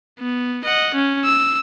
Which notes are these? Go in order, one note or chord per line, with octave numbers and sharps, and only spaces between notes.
B3
D#5 F#5
C#4
E6